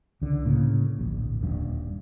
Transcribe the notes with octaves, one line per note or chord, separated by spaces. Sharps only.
C#2 D3
A2 C#3 A#3
D1 A#1
D#1 G2